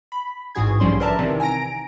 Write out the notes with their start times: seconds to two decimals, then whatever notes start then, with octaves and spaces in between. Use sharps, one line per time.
0.12 B5
0.55 A1 G#2 E3 F#4 G#4 G#6
0.80 B1 D3 F3 G3 C#4 C6
1.00 A#4 B4 D5 E5 A5 A#5
1.19 C3 D#3 E3
1.40 G#5 A#5 A#6 D7